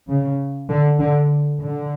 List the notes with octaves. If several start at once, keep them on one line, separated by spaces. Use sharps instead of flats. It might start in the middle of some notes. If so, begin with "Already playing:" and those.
C#3
D3
D3
D3